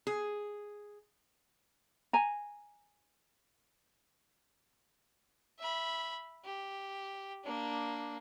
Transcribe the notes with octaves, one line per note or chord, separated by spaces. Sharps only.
G#4
G#5 A#5
E5 B5
G4
A#3 D4